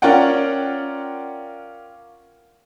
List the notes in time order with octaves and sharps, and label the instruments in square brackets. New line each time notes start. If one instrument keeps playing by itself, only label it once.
[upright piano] C#4 F4 A#4 D5 F#5 G5